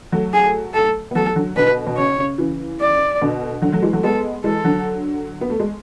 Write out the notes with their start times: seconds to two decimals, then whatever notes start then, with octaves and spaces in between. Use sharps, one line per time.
0.12 F#3 A3
0.33 G#4
0.74 A4
1.11 B3
1.15 F#3 A3 A4
1.36 D3 F#3
1.56 B2 D3 B4
1.87 B2
1.97 C#3 C#5
2.18 C#3
2.38 C#3 E3
2.80 D5
3.22 B2 D3
3.62 D3 F#3
3.72 F#3 A3
3.82 E3 G#3
3.92 F#3 A3
4.03 G#3 B3 A4
4.44 E3 G#3 A4
4.64 D3 F#3
5.41 B3
5.50 A3
5.60 G#3